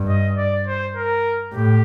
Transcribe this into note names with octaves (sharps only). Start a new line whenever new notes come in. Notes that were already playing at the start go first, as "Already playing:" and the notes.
Already playing: G2
D#5
D5
C5
A#4
A2 G4